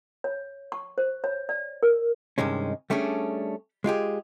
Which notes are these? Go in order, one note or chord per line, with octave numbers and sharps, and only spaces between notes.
C#5
C#6
C5
C#5
D5
A#4
G2 C3 D#3 G#3 C#4
G3 A3 C#4 D4 G#4
G#3 F4 G4 G#4